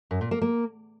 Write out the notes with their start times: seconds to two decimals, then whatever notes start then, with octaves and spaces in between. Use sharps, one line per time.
0.11 F#2
0.21 A#2
0.31 A#3
0.42 A#3